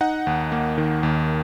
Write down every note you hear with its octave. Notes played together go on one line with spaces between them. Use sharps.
D#4 F#5
D#2
A#3
D#3
D#2